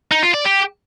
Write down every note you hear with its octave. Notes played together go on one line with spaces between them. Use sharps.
D#4
F4
D5
G4